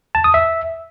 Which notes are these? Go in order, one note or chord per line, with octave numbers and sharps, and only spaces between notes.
A5
D#6
E5